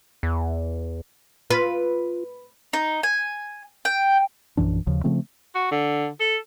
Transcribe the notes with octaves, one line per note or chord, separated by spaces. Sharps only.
E2
F4 B4
D#4
G#5
G5
A#1 F#2 E3 D4
D#2 C#3 F3
C#3 F3 A3 C4
F#4
D3
A4